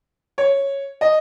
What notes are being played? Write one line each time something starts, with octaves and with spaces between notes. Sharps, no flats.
C#5
D#5